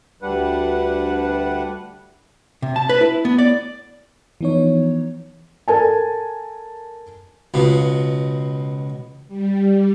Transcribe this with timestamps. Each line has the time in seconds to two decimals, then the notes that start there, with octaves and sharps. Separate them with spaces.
0.22 D2 G3 D4 B4 F#5
2.62 C3
2.76 A5
2.89 B4
3.01 E4
3.25 B3
3.38 D5
4.41 E3 F3 B3 D#4 C#5
5.68 A4 A#4 G#5 A5
7.54 C#2 B2
9.28 G3